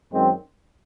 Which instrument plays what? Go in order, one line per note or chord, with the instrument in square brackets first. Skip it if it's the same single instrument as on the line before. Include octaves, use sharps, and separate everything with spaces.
[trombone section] F#2 D#3 G#3 C4